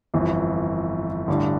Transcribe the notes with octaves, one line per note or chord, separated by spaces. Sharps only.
G1 F2 E3
A1 G2 D3